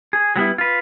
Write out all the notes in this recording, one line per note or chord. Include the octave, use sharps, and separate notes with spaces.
G#4
F#3 G3 B3 E4
F4 B4